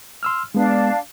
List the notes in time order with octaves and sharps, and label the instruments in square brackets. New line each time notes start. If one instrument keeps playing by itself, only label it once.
[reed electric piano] C6 E6 F6
[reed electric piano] G#3 B3 [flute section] D4 F5